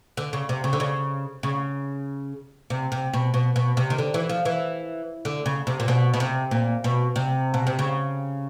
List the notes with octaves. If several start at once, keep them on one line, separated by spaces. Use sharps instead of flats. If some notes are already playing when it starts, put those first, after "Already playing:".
D3
C#3
C3
C#3
D3
C#3
C#3
C3
C3
B2
B2
B2
C3
D#3
D3
E3
F3
E3
D3
C#3
C3
A#2
B2
B2
C3
A#2
B2
C3
B2
C3
C#3